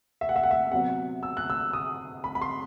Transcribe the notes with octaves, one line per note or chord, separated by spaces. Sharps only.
E5
F#5
E5
F#5
E5
C3 F#3 B3 F#5
E6
F#6
E6
D#6
B5
B5
C6